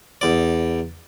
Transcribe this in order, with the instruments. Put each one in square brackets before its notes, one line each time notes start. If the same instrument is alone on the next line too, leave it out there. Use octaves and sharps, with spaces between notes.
[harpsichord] E2 D5